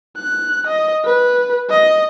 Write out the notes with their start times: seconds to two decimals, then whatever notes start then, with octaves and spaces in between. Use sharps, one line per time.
0.17 F#6
0.67 D#5
1.05 B4
1.70 D#5